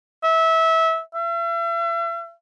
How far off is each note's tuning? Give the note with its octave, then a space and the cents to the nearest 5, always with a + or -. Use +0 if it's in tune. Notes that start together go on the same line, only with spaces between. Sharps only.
E5 -20
E5 +40